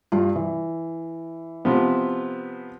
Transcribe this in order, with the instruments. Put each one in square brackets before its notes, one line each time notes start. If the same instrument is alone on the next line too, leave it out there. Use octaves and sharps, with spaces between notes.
[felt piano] G2 F4
E3
[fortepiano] C3 F3 B3